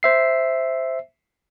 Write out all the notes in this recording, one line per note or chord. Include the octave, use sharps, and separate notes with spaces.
C5 E5 C7